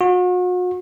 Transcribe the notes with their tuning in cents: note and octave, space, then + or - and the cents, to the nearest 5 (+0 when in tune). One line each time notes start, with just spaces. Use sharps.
F#4 -40